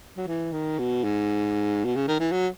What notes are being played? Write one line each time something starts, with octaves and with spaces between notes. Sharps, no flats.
F#3
E3
D#3
B2
G#2
B2
C#3
D#3
E3
F#3